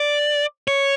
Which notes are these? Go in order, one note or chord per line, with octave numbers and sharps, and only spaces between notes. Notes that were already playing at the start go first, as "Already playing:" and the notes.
Already playing: D5
C#5